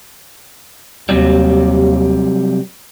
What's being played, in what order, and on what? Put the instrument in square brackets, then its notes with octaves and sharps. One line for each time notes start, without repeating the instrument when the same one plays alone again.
[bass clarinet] D#2 [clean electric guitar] C3 F#3 G3